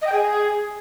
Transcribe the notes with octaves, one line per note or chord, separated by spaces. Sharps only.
D#5
G5
G#4